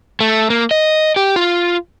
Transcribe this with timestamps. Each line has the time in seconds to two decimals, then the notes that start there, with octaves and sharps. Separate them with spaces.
0.20 A3
0.50 A#3
0.71 D#5
1.16 G4
1.36 F4